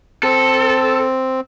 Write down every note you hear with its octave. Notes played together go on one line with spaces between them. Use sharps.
C4 A4